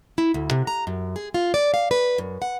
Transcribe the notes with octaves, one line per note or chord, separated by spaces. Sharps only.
E4
D2
C3
A#5
F#2
G#4
F4
D5
F5
B4
F#2
F#5